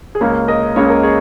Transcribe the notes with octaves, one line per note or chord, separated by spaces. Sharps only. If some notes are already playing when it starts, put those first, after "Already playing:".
G#4
C#2 C#3 A#3 C#4 A#4
A#4 D#5
C#2 C#3 A#3 C#4 C#5
A#4
G#4 C#5